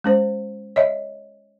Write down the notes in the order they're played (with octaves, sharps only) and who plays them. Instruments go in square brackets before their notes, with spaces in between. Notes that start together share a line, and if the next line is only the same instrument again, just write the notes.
[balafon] G#3 C#4 C5
C#5 D#5 E5